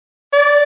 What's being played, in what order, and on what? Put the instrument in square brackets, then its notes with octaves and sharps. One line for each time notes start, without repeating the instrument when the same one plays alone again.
[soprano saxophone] D5